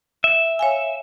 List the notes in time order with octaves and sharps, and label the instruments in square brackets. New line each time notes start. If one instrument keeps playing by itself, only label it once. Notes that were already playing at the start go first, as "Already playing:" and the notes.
[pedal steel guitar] E5
[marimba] C#5 F5 G#5